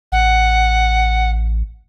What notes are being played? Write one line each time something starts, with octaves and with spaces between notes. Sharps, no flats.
A1 F#5